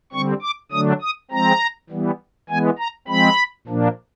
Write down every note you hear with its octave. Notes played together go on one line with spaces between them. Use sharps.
D3 G3 C4 C#6
D6
D3 F#3 A3 D4 D#6
D#6
F3 G#3 C4 A#5
E3 G3 B3
E3 G#3 B3 G#5
A#5
F3 G#3 C4 B5
A#2 F3 A#3 D4